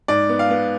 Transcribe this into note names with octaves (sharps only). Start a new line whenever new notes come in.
G#2 D5
B3
F5
B3